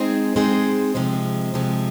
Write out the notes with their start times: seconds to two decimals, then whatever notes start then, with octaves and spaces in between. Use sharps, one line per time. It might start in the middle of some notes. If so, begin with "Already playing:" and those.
Already playing: G#3 C4 D#4 G#4 C5
0.36 G#3 C4 D#4 G#4 C5
0.95 C3 F3 G#3
1.54 C3 F3 G#3